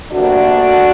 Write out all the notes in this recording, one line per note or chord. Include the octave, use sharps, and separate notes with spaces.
D2 C3 G3 A#3 D4 F#4